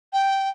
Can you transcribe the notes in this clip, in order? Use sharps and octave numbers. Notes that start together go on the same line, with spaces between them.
G5